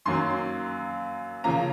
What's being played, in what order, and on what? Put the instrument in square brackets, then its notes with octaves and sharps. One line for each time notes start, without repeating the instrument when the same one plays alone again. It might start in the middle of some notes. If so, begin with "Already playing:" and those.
[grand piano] F#2 D#3 F#3 A#3 C#4 C6
C#3 F3 A#3 C#4 A#5